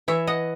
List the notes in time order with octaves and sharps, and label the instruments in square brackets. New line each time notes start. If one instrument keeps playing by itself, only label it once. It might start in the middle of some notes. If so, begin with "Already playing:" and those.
[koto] E3 C#5 E5
D#5 F#5